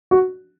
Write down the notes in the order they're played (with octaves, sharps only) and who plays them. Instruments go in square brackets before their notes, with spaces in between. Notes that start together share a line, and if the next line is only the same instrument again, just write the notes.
[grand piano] F#4